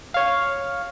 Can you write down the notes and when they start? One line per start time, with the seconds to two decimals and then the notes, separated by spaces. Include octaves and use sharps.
0.14 C#5 F5